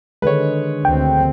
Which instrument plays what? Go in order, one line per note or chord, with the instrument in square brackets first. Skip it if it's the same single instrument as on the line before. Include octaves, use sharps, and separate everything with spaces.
[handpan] D3 D#3 G#3 [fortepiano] B4 C#5
[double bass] D2 C4 [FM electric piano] G5